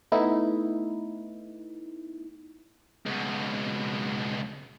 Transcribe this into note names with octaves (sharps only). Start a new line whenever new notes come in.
A3 B3 D#4 E4
C#2 B2